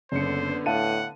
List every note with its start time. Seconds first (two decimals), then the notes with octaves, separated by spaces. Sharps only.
0.12 F#1 D3 B3 C5 C#7
0.66 A2 F5 F#5 A5 D#7